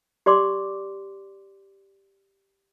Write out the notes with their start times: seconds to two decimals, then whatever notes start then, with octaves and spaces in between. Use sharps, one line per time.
0.26 G4 D5 C6 D6